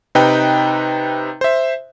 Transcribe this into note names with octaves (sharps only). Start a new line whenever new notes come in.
C3 D#4 B4 G5
C5 E5